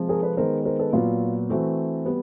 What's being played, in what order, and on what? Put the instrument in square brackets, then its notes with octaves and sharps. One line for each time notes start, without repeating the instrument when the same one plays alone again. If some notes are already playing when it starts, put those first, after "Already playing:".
Already playing: [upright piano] C3 F3 G#3
G#4 A#4
A4 B4
D#3 G#3 B3 A#4 C5
A#4 C5
A4 B4
A#2 F#3 B3 F4
E3 A3 C4 F#4
G3 B3